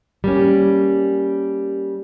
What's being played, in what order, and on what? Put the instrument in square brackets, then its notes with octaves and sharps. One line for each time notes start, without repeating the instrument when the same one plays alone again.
[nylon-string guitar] G3 A#3 C#4